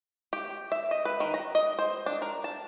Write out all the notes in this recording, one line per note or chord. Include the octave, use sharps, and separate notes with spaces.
G4
E5
D#5
B4
D#3
A#5
D#5
C5
D4
A#4
A5